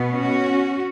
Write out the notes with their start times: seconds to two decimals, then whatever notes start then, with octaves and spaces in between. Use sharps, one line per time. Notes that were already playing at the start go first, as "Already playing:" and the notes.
Already playing: B2 B3
0.12 C#4 F#4